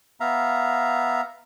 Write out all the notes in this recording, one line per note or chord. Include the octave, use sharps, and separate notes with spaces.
B3 E5 F5 A#5